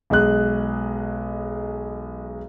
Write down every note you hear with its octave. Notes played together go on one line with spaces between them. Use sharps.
B1 G#3 G#4 F#6